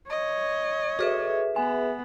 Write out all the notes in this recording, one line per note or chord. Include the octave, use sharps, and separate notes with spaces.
C#5 D#5
F#4 G#4 A4 B4 E5
B3 G#5